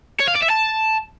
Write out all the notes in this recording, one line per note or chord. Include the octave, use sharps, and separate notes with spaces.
C#5
F5
D5
E5
A5